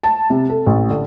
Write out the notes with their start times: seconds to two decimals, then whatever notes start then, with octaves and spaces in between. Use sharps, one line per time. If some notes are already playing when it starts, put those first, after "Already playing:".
0.03 A5
0.30 C3
0.50 A4
0.66 A1
0.90 D3